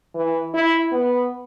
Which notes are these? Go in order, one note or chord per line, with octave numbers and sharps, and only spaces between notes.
E3
E4
B3